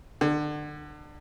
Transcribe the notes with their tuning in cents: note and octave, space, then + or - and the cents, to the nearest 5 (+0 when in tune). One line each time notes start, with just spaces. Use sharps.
D3 +30